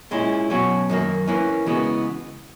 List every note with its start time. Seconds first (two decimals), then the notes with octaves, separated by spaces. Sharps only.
0.11 A#2 G#3 C#4 E4
0.50 B2 F#3 C#4 F#4
0.89 F#2 D#3 A#3
1.27 E3 A#3 C#4
1.66 C#3 E3 G#3 B3 F#4